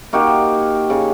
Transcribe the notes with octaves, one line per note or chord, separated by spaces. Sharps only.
A#3 D#4 F#4 G4
C#3